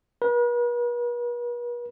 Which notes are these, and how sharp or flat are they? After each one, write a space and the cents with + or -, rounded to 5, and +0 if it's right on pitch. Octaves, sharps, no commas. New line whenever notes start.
B4 -45